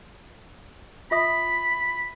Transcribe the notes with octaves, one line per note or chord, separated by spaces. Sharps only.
F4 E5 B5 D#6